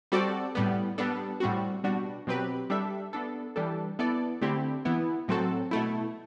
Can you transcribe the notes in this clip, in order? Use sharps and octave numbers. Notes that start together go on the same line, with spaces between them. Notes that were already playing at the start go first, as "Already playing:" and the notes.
G3 C4 F#4 A4 D5
A2 G3 B3
G3 B3 D4 A4
A2 G3 C4 F#4
B2 G3 D4 F#4
B2 F#3 C4 G4 B4
G3 D4 A4 E5
B3 D4 A4
E3 G3 D4 A4
B3 E4 A4 D5
D3 A3 C4 E4 G4
E3 B3 E4
A2 F#3 C4 F#4 A4
B2 A3 E4